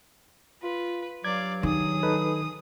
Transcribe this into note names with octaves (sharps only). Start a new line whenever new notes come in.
F4 B4
G2 F#3 D5 F5 G#6
D#3 G#4 D#6
D#4 A4 B4